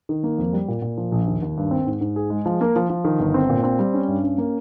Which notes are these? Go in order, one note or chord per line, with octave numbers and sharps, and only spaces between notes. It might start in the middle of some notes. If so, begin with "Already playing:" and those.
D#3
A#3
F2
G3
A#2
A#2
F3
A#1
D#2
D#2
G2
C4
G#2
G#2
G#4
G#3
F3
A#3
F3
F3
D#3
G1
C4
A#2
C4
G3
C#4
G2
C#4
A#3